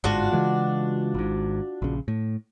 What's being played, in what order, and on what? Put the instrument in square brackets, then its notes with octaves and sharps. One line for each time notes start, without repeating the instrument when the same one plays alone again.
[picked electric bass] G1 G#2 [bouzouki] D4 F4 F#4
[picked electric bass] C#3 E3 G#3
G#1 G#2
A#1 C#3
A2